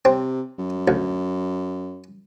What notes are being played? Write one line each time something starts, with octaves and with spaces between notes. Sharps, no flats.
C3 C4
F#2
D2